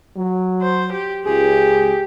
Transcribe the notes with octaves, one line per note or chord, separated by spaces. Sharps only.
F#3
C5
G4
C#2 G4 G#4